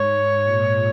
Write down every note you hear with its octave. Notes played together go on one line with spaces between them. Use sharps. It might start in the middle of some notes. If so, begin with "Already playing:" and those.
Already playing: G#2 C#5
A#2